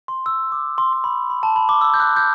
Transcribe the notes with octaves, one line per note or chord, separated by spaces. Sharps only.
C6
E6
D6
C6
C6
B5
B5
A5
B5
D6
E6
G6
F#6
G6